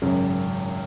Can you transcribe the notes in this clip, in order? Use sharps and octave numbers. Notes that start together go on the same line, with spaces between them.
G#1 F#2 C#3